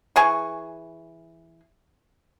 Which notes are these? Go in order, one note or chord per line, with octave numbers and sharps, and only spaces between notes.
E3 G#4 G#5 C#6